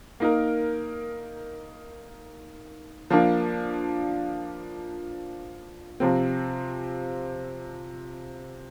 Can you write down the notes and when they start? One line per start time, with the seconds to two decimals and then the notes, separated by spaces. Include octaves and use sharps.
0.20 A#3 D#4 A#4
3.10 F3 A#3 D4
6.00 C3 F3 C4